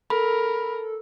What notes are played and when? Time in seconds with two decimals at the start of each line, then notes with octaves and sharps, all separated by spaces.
0.10 A4 A#4 B5